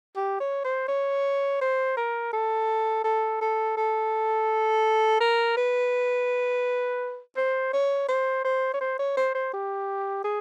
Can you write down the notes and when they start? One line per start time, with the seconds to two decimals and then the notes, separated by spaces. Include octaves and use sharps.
0.16 G4
0.40 C#5
0.64 C5
0.88 C#5
1.61 C5
1.97 A#4
2.33 A4
3.04 A4
3.41 A4
3.77 A4
5.20 A#4
5.57 B4
7.37 C5
7.73 C#5
8.08 C5
8.44 C5
8.74 C#5
8.81 C5
8.99 C#5
9.17 C5
9.35 C5
9.53 G4
10.24 G#4